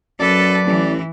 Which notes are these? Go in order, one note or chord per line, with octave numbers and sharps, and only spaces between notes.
F#2 F#3 A4 B4 D5 A5
A1 E3